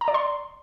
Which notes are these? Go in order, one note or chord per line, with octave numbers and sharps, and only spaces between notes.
A#5
D5
C6